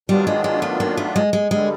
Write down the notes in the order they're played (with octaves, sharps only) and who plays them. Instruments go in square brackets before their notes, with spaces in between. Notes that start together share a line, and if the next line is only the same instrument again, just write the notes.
[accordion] D#3 F#3 B3 D4 F4 [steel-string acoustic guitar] G3
[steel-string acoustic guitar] G#3
G#3
A3
A#3
A3
G#3
G#3
[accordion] G2 D3 G3 [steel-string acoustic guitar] G#3